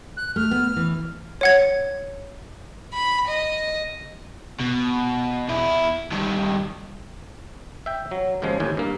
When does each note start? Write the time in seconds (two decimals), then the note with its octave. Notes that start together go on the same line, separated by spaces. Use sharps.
0.17 F#6
0.36 A3 F6
0.51 B3
0.76 E3
1.41 C#5 F#5 G#6
2.94 B5
3.28 D#5
4.60 B2
5.49 E2 E4
6.12 G2 D#3
7.86 E5 G5
8.11 F#3
8.42 D#2 G#2 C#3 F3 G#3
8.60 D#2 A2 G#5
8.77 G2 A#3